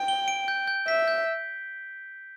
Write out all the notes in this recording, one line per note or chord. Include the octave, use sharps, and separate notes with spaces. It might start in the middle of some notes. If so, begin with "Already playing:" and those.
Already playing: G5
G7
D7
G6
G6
E5 B6
G6